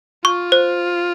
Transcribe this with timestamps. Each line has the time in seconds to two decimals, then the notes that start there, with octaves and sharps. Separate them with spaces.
0.25 F4 C#6
0.52 C5